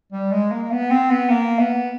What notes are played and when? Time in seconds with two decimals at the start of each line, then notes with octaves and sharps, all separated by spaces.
0.13 G3
0.32 G#3
0.52 A#3
0.71 B3
0.91 C4
1.10 B3
1.30 A#3
1.59 B3